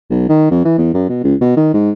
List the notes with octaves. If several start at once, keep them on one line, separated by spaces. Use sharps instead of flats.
B1
D#3
F2
E3
E2
F#2
B2
C#2
B2
D#3
G#2